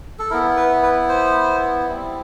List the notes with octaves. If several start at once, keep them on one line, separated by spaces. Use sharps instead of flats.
A4
B3 E4 A#4
B4
B4
C5
G3 C4 E4